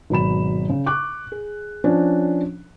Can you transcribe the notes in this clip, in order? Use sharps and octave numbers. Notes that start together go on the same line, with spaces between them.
G#1 B2 F#3 B5 E7
C#3
C#6 D6 F#6
G#4
F3 C#4 D4